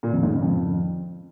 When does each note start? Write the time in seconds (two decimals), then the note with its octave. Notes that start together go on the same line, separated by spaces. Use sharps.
0.03 A#2
0.13 F2
0.23 G#2
0.33 C#3
0.42 F2